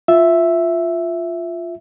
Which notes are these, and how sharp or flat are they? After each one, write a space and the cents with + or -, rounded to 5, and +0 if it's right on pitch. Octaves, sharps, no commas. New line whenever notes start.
F4 +0 E5 +0